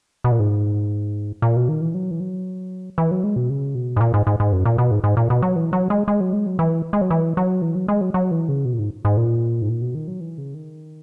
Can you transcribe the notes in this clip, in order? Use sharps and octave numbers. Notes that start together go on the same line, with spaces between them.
B2
A#2
G#2
A#2
B2
D#3
E3
F#3
E3
F#3
E3
F#3
G#3
B2
C#3
B2
G#2
A#2
G#2
G#2
G#2
F#2
A#2
B2
G#2
G#2
A#2
B2
F#3
E3
F#3
G#3
G#3
F#3
G#3
F#3
E3
G#3
F#3
E3
F#3
E3
F#3
G#3
F#3
F#3
E3
C#3
B2
A#2
G#2
G#2
A#2
G#2
A#2
B2
D#3
F#3
E3
C#3
D#3